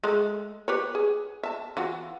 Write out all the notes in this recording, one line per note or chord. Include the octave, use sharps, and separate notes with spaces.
G#3 A3
G4 B4 C#5
G#4
E5 A5
E3 F4 F#4